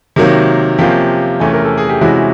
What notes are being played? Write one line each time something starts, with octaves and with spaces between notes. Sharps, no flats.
C3 D#3 F#3 A#3
C3 F3 A#3 C#4 F4 G4
E2 C3 E3 A3 C#4
A#4
A4
G#4
G4
C3 E3 G#3 C#4 E4 F#4